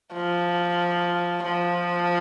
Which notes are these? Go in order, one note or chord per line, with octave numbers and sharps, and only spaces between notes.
F3
F3